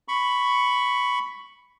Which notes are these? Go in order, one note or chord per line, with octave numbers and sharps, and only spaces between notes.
B5 C#6